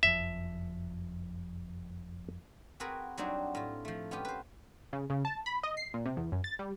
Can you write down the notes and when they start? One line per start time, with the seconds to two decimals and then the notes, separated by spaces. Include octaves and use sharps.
0.03 F#1 F2 F3 E5
2.80 C4 F#4 G#4 A#4 B4
3.18 F#3 G3 C4 D4 D#4 F#4
3.55 A2 F4
3.85 F3 A3
4.11 B3 C#4 F4 G4
4.25 B4 C5
4.93 C#3
5.10 C#3
5.25 A5
5.46 B5
5.63 D#5
5.77 C7
5.94 A#2
6.06 C3
6.17 E2
6.32 F#2
6.44 A6
6.59 G3